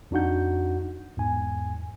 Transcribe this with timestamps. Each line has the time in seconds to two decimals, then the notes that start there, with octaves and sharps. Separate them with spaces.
0.11 F2 D4 D#4 F#4 F#5 G6
1.17 E2 G#2 G#5